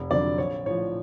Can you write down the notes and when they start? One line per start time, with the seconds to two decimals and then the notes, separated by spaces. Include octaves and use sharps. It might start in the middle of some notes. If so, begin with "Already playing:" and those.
Already playing: F1
0.11 F2 D3 F#3 D5
0.38 A#1 C#5
0.66 A2 C#5
0.70 F3